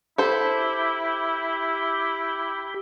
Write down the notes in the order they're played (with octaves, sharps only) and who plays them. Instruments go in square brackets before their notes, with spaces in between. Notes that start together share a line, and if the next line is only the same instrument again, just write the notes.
[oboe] E4 [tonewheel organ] G4 [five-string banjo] A4 C5